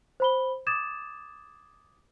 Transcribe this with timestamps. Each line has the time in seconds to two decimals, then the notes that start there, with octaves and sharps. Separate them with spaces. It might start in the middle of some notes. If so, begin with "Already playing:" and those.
0.20 C5 B5 G7
0.67 D6 D#6 G#6 A6 E7